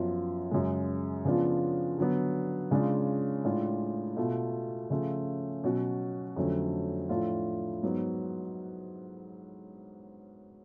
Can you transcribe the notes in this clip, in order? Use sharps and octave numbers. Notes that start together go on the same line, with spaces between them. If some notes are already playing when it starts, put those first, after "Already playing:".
Already playing: F#2 F3 B3 F4
F#2 C#3 G#3
C#3 F3 B3 D4 F4
D3 F#3 B3
C#3 G#3 D4 F4
A2 G#3 D4 F4
B2 A3 F4
C#3 F3 A3 F4
B2 F#3 C#4 F#4
F2 D3 F#3 A3 C#4
A2 F3 A3 D4 F4
G#2 F#3 B3